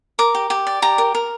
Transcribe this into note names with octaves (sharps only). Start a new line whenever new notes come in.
A#4 D6
G4
G4
D5
G4 A#5
A#4
A#4